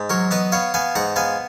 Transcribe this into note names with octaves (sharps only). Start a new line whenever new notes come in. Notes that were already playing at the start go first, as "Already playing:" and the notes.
Already playing: G#2
F#3 A#4 C#5
B3 B4 D#5
B3 C#5 F5
B3 F5 G#5
G#2 F#5 A#5
B3 F5 G#5